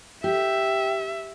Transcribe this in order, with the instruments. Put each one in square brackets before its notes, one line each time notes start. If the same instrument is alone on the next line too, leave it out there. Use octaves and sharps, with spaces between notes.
[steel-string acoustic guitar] G4 [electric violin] E5